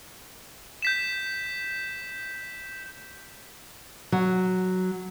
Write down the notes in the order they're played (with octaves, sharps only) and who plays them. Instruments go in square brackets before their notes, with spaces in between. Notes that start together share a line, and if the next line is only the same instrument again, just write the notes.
[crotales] G6 B6 E7
[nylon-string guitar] F#3